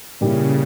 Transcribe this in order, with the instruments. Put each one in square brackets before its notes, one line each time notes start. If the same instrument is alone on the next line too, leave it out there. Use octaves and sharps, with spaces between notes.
[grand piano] A#2 G3 A#3 E4 [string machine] C#3